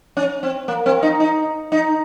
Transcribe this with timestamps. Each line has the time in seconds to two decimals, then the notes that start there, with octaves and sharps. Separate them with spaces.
0.17 C#4
0.43 C4
0.68 A#3
0.86 C4
1.03 D#4
1.20 D#4
1.72 D#4